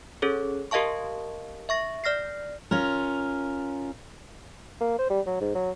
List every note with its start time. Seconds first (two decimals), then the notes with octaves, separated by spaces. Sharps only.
0.22 C#4 G#4 A4 C#5
0.71 G4 A#4 D#5 F5 A5 C#6
1.69 E5 C#6 A#6
2.04 D5 F6 A#6 C7
2.71 C#4 F4 A#4
4.81 A#3
4.98 C5
5.10 G3
5.26 F#3
5.41 G#2
5.55 F#3